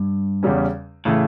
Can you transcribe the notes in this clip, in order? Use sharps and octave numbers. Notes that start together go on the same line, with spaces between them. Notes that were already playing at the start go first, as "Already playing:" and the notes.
Already playing: G2
E2 C#3 G3 C#4
A2 C#3 E3 A3